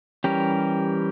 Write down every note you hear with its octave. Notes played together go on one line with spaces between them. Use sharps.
E3 G3 C#4 G4 A#4